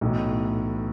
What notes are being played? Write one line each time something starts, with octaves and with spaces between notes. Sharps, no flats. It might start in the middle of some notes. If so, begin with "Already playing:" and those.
B1 A2 E3